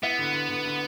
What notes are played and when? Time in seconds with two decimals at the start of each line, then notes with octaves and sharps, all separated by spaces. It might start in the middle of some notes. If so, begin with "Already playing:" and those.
0.03 B3 E4
0.19 D3
0.34 D3
0.49 D3
0.65 D3